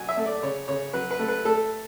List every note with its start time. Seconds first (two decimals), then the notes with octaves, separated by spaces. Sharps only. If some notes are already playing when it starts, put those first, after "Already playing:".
Already playing: B2 F#3 G#5
0.09 E5
0.17 A3
0.25 D5
0.43 C#3 C#5
0.68 C#3 C#5
0.93 F#3 B4
1.11 B4
1.19 A3
1.28 B4
1.45 A3 A4